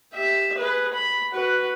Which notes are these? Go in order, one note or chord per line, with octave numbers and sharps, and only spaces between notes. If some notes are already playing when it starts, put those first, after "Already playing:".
G4 E5
G#4 B4
B5
F#4 B4